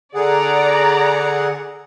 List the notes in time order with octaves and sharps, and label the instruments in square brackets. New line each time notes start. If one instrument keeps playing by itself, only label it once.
[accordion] D3 G#4 F#5 [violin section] D5 A#5